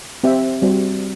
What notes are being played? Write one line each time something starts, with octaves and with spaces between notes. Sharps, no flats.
C4 G4 C5 E5
G3 C4 F#4 C5